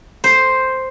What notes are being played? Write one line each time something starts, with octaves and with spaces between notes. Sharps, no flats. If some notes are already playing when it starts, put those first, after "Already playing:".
C5